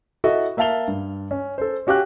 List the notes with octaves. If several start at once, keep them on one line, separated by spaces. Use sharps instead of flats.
E4 F#4 A4 D#5 E5
A#3 E5 F5 A5 F7 G7
G2
C#4
A4 C5
C#4 F#4 G4 F5 F#6